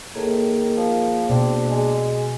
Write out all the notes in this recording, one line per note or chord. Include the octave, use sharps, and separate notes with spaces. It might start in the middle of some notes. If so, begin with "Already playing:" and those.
A2 D#3 A#3 G#4
F3
B2 C4 D4
G#3